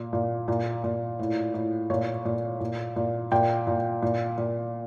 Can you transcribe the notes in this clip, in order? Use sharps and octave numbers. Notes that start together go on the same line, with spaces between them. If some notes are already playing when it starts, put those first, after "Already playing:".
Already playing: A#2
A#2
A#2
A#2
A2
A2
A#2 C#5
A#2
A#2
A#2
A#2 G5
A#2
A#2
A#2